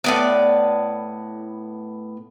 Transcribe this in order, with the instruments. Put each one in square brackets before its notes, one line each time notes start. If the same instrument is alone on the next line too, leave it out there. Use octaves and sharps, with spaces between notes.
[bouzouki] A2 B3 D5